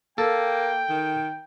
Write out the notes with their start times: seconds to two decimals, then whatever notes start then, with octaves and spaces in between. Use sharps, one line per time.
0.18 A#3 A4 G5
0.89 D#3